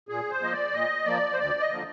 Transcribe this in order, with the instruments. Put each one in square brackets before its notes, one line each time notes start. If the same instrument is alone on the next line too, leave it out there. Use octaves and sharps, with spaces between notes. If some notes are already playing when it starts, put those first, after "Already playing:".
[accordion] A#2 G#4
C5
F3 A#3 D#5
D5
A#2 D#5
F3 A#3 D5
C5
D2 D5
D#5
D3 F3 A#3